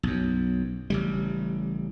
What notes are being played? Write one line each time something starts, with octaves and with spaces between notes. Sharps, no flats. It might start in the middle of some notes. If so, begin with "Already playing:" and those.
B1 F#2
A1 C#3 G3